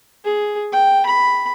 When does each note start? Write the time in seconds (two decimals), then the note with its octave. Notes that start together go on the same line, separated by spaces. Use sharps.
0.25 G#4
0.73 G5
1.06 B5